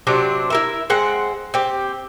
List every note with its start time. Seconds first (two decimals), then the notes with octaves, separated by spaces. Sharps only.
0.07 C3 F#3 C4 D4
0.50 E4 A#4 E5
0.90 G#3 C4 F#5
1.54 C4 G4